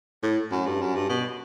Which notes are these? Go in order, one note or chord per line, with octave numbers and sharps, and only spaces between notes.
A2
F#2
G2
F#2
G2
B2